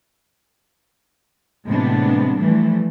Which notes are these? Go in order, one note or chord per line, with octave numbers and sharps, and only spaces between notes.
A2 C3 E3 G#3 B3 D4
E3 F3 G3 A3